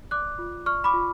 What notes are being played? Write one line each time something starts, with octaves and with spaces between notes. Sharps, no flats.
D5 D6 F#6
F4
D5 C#6 F6
B5 D6
F4